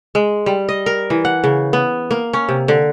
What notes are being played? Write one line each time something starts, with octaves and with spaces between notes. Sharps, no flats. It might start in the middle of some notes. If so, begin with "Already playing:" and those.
G#3
G3
D#5
A#4
E3
F#5
C#3
B3
A#3
C#4
C3
D3